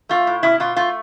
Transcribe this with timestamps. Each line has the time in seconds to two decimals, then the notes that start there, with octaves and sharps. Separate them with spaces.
0.09 A3 F4
0.27 A2
0.43 B2 E4
0.60 B2 F4
0.76 A3 F4